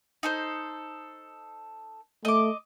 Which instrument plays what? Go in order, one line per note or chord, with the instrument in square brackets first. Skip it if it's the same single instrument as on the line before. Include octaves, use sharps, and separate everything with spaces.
[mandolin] D#4 A4 C5
[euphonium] A3 [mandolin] D#5 D6